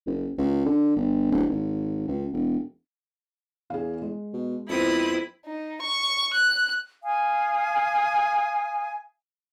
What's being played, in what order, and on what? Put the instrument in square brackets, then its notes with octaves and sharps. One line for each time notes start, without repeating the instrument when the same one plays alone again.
[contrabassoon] F#1
C#2
D3
G1
D1
G#1
C#2
E1
[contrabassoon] E2 [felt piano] G#4 F5
[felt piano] G#3
[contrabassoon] B2
[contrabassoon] F2 [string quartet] B3 C4 D#6 [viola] E4
[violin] D#4
C#6
F#6
[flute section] F5 G#5 D#6